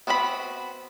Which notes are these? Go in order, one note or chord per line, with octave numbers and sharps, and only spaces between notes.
B3 C4 F#4 A#4 B5